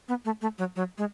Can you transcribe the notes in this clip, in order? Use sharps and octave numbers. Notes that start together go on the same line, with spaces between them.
B3
A3
A3
F#3
F#3
G#3